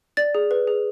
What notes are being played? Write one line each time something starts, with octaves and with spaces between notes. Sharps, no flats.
D5 A6
G#4
B4
G#4